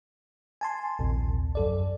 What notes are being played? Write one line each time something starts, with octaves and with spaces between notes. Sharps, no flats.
G#5 A5 C6
A#1 D#2 C3
F#2 A4 D5